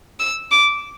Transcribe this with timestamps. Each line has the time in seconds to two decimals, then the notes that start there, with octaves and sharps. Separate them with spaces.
0.19 E6
0.51 D6